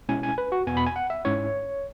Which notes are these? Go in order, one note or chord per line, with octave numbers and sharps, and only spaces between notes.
B2 G#3 C#4 E4 G#5
G#5
B4
F#4
E2 B2 B3 G#5
B5
G#5
F#5
E5
G#2 G#3 C#4 E4 C#5